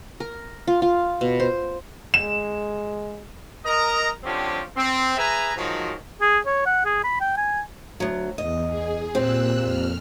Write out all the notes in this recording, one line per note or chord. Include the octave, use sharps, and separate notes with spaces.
A#4
F4
F4
B2
C5
G#3 E7
A#4 D#5 A#5
D3 F3 C4 C#4 G4
C4
G#4 B4 E5 G#5 A#5
G#2 D#3 F3 F#3
G#4
C#5
F#5
G#4
B5
G5
G#5
D2 F#3
E2 D#5
G#4
A#2 C4 G4 E6 F#6
F2 F6